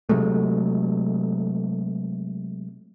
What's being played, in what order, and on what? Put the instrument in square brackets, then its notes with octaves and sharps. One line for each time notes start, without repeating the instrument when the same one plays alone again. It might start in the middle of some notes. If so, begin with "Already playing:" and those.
[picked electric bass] C3 F#3 G#3 A3